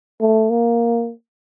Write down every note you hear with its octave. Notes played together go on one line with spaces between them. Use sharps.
A3
A#3